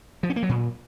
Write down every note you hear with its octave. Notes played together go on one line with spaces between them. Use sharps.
F3
C#4
A#3
F#3
A#2